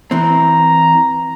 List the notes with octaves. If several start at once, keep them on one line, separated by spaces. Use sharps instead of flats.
E3 C4 A#5